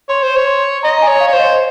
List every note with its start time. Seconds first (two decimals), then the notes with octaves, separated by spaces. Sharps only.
0.09 C#5 C6
0.23 C5
0.36 C#5
0.46 C6
0.83 D#5 A#5
0.97 A#5
1.02 G#5
1.08 C#5
1.20 F5
1.28 C#5
1.33 C5
1.39 D#5